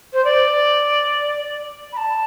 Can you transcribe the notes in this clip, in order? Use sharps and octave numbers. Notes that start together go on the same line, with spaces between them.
C5
D5
B5
A5